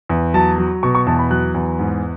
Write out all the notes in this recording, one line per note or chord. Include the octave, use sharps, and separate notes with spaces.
E2
F#3 A5
F#3
B2 C#6
C#6
E2 A5
B5
F#3 F#6
E2
G#2